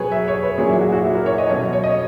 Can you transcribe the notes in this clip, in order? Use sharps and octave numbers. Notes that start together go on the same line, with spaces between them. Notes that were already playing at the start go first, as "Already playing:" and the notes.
Already playing: B2 F#3 G#4 B4 C#5
E5
C#5
B4
A#2 F#3 G#4
E4
F#4
F#4
E4
A#4
C#5
D#5
B2 F#3 C#5
C#5
D#5